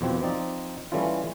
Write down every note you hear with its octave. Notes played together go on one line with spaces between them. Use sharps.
E2 B2 F3 C4
F3 C4 D#4 D5
E3 G3 A3 C#4 E4 F4